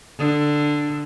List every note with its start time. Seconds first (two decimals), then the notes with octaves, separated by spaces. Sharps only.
0.18 D3